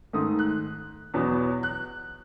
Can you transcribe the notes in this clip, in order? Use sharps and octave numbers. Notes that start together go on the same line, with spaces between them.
G#2 D#3 A3 D#6
F#6
E2 B2 F#3 B3
F#6